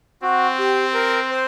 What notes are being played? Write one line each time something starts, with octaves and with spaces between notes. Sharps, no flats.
C4 F#4
G4
A#4
C5